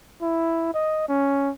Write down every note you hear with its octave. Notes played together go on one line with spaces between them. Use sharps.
E4
D#5
C#4